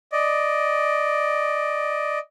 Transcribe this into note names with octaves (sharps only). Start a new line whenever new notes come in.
D5 D#5